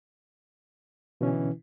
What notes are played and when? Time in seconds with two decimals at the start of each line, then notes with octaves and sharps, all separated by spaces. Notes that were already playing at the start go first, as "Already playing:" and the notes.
1.21 B2 D3 E3 C#4